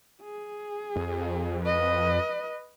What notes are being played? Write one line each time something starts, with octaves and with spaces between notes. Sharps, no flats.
G#4
F2
B4 D#5